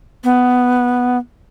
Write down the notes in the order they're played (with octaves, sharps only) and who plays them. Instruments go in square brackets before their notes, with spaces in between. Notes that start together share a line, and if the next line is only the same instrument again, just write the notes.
[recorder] B3